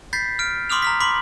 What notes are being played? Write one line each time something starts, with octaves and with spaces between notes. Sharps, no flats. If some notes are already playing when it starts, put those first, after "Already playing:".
B5 G6 A6 B6 C7
F6 D7
B5 C6 D6 D#6 F6 F7
A#5 F6 B6
B5 C6 D6 B6 F#7